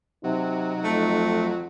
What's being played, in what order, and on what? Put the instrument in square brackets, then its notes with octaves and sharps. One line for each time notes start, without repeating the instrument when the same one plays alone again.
[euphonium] C3 [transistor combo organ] F#3 [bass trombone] D#4
[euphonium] F2 [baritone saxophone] A3